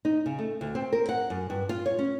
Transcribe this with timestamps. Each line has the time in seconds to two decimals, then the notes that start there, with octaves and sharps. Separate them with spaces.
0.05 D#4
0.26 C#3
0.39 A3
0.61 D2
0.75 C4
0.93 A#4
1.09 F#5
1.30 F#2
1.50 G2
1.69 F4
1.86 C#5
1.99 C#4